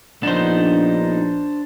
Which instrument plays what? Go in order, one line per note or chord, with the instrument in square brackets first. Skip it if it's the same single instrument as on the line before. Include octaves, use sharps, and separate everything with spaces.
[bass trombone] A#1 [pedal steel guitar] B3 D#4 [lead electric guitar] D4 C5